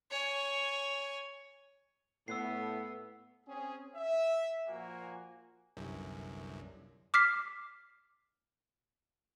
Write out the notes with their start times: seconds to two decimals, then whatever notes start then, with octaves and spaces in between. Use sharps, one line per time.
0.11 C#5 G#5
2.28 A2 B3 E6 F#6 C7
3.46 C4 C#4 G#4
3.96 E5
4.68 A#2 F3 A#3 F#4 G#5
5.77 G1 C2 F#2
7.14 D6 F6 B6 C7